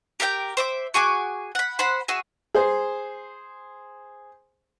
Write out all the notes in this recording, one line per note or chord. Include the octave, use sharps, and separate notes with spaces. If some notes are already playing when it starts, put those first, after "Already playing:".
G4 A#4 F5 G5
C5 E5 D6
F#4 G#4 G#5 D6
F#5 B5
C5 F#5 B5 C6
F#4 G#4 E5
G#4 C5